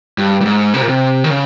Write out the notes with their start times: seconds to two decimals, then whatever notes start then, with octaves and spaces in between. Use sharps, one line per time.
0.18 G2
0.41 G2
0.45 G#2
0.74 C3
0.82 A#2
0.89 C3
1.24 D#3
1.30 C#3